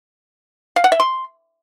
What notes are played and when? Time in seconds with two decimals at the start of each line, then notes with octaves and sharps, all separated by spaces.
0.76 F5
0.84 F#5
0.92 E5
1.00 C6